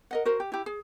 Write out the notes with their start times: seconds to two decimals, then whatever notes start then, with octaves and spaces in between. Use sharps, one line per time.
0.11 A#4 D#5 F#5
0.25 F#4 A#4 C5
0.40 G4
0.52 E4 G4
0.66 G#4